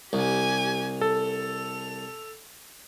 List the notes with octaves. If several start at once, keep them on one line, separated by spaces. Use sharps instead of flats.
C2 G4 G#5
A4 F7